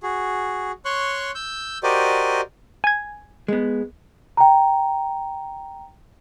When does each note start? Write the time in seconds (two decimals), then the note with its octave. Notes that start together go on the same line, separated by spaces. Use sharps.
0.03 F#4 G#4
0.85 C#5 C6 C#6 F#6
1.35 E6 G6
1.83 F#4 G4 A#4 C5 D5 D#5
2.84 G#5 G#6
3.48 G#3 B3
4.37 G5 A#5